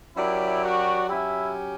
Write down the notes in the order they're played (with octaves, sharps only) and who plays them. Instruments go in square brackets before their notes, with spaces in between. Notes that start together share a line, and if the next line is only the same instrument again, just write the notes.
[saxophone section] F#3 C#4 G4 A#4 D5 [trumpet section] E4
[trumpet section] F#4
[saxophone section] F#3 C#4 G4 [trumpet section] E4